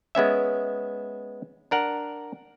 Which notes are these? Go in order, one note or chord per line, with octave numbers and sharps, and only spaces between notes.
G#3 B3 C#4 E5
D4 A#4 F#5